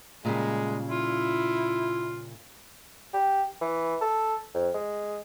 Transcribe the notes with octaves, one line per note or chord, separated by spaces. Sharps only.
A#2 C#3 G3 G#3
E4 F4
G4
E3
A4
F2
G#3